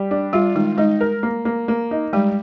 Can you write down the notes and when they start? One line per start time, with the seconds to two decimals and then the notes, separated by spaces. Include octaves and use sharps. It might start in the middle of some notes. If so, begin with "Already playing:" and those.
Already playing: G3
0.11 D4
0.33 G3 F4
0.55 D#3 G#3
0.77 G#3 D#4
1.01 A#4
1.23 A#3
1.45 A#3
1.68 A#3
1.91 D#4
2.13 G3 G#3